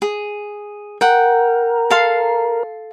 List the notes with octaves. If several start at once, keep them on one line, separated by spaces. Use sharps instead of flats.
G#4
A#4 F#5 G5
A4 F5 C6